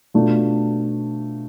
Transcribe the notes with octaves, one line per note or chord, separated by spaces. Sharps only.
B2 A3 D4 F4